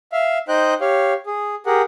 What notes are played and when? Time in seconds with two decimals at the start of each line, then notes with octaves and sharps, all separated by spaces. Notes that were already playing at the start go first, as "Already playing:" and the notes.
0.12 E5 F5
0.48 D#4 C5 D#5 G5 F#6 G6
0.81 G4 C#5 F5
1.26 G#4
1.66 G4 G#4 A#4 F#5